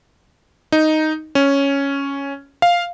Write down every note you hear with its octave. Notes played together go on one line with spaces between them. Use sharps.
D#4
C#4
F5